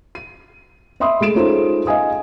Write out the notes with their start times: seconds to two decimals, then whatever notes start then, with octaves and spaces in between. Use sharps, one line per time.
0.15 D#7
1.00 D#5 E5 B5 C6 D#6
1.21 G#3 A3 D7 E7
1.35 C#4 D#4 F4 G#4 A4 C5
1.87 D#5 F5 G#5 D#6